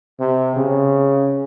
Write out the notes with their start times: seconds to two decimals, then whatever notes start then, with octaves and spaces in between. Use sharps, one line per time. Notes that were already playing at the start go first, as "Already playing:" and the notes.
0.20 C3
0.56 C#3